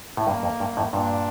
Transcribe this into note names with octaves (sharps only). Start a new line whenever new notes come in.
A2
G2 A#3
F2
G2
F2 A2
G2 A#2 D4